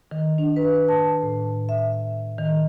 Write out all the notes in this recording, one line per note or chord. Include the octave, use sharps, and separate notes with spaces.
D#3
D4
B4
A5
A2
E5
D#3